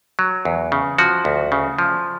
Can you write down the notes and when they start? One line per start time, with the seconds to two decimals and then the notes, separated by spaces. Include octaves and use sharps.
0.19 F#3
0.45 E2
0.72 C#3
0.98 F3 F#4
1.25 D2
1.52 C#3
1.79 F3